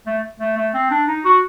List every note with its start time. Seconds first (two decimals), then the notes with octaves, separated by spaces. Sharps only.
0.06 A3
0.40 A3
0.57 A3
0.74 C4
0.91 D4
1.08 D#4
1.25 F#4